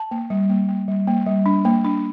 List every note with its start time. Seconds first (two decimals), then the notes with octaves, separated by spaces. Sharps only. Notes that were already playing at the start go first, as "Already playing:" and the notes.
Already playing: A5
0.11 A#3
0.30 G3
0.49 A#3
0.68 A#3
0.88 G3
1.07 A#3
1.27 G3
1.46 D4
1.65 A#3
1.85 D4